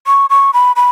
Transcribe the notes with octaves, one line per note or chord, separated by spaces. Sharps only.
C#6
C#6
B5
B5